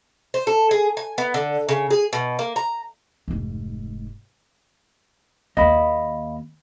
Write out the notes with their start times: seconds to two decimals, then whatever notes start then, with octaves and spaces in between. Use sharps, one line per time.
0.34 C5
0.47 A4
0.71 G#4
0.97 G#5
1.18 B3
1.34 D3
1.69 C#3
1.91 G#4
2.13 B2
2.39 A#3
2.56 A#5
3.28 F1 G#2
5.57 D#2 A#3 D#5 F5 B5